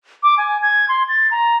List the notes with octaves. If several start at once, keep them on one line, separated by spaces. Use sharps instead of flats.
D6
G#5
G#6
C6
A6
A#5